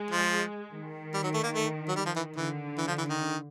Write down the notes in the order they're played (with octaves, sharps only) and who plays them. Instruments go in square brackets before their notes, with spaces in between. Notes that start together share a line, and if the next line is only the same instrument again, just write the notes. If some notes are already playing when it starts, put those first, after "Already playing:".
Already playing: [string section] G#3
[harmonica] F3
[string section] D#3
[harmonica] G3
F#3
A3
A#3
A3
F#3
G3
F3
E3
[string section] D3 [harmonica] E3
[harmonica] E3
F3
E3
D#3